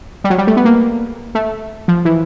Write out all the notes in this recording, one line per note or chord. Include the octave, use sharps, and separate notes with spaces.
G3
F#3
G3
A3
B3
A#3
A3
F3
E3